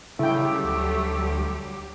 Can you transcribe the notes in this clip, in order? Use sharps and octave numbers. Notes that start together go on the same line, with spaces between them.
C#3 F#3 G3 A3 E4 G4 G5
D2